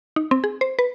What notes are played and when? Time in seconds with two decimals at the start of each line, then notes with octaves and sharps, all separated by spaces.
0.16 D#4
0.31 C4
0.44 G#4
0.61 C5
0.79 B4